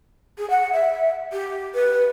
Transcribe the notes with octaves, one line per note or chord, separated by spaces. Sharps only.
G#4
F#5
E5
G4
B4